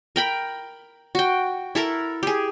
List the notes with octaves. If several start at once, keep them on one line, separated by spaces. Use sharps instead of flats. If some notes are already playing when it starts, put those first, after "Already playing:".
A#4 G5 B5
F#4 G5
E4 A4 A#4
G4 G#4